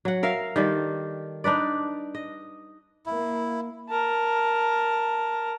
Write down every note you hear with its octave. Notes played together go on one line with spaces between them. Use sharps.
F#3 F#5
A#4 E5 F5
D#3 G3 A4
D4 D#4 B4 D5
D#5
A#3 E4
A#4 A5